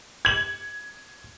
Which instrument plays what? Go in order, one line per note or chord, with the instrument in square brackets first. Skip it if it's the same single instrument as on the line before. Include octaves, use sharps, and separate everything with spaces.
[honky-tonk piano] G#6 F#7